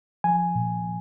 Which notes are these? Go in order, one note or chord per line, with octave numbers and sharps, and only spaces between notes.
F3 G#5
A#2